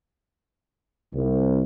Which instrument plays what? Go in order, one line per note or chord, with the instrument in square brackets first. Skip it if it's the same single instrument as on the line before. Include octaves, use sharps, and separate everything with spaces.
[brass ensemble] C2